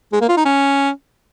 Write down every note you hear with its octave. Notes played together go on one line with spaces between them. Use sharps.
G#3
A#3
F4
D#4
C#4